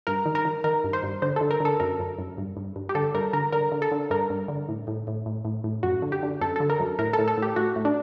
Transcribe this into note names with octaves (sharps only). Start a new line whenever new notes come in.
G2 A#4
D#3
A#4
D#3
D#3 A#4
G2
C5
G2
D3 C5
D3 A4
A#4
D3 A4
F#2 A#4
F#2
F#2
G2
G2
G2
G4
D3 A4
G2 A#4
D3 A#4
D3 A#4
D3
A4
D3
G2 A#4
G2
D3
A2
A2
A2
A2
A2
A2
F#2 F#4
D3
G4
D3
F#2 A4
D3 A4
A#4
F#2
A2 A#4
A4
A2
A4
A2 G4
A2 F#4
A2
D4